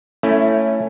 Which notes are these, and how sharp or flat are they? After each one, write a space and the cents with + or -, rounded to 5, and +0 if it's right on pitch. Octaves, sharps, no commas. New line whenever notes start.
A3 +15 C#4 +0 E4 +0